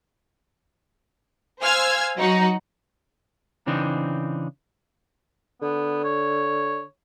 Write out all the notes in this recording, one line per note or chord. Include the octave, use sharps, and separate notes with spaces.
C5 F5 G#5 E6 F6 G#6
F#3 D#4 F#4
C#3 E3 C4 D4 D#4
D3 B3
C#5